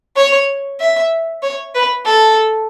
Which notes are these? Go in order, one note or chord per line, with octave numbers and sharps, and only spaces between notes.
C#5
E5
C#5
B4
A4